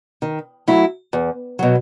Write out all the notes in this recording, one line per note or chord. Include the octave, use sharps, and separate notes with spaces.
D#3
F#3 A3 E4
E2
B2 F#3